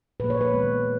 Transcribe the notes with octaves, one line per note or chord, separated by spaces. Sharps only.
A#2 F3 A#3 B4
C#5
B4
D#3 G#3 B3